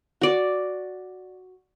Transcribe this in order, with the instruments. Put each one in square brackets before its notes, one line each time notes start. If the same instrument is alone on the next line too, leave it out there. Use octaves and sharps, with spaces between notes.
[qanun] F#4 D5